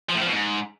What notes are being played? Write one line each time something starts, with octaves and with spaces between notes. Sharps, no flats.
F3
A2
F3
B2
G#2